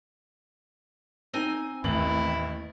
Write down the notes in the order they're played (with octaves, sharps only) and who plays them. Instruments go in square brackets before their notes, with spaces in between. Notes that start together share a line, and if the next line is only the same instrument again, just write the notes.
[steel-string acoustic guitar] C4 D#4 G#5
[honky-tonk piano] A1 F#7 [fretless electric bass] D#2 [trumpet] E4